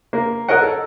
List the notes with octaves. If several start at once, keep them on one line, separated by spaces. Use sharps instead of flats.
A#3
A#4 C#5 D#5 F#5
A4